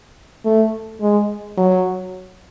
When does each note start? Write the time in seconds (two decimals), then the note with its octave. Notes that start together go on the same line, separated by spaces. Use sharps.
0.45 A3
1.01 G#3
1.57 F#3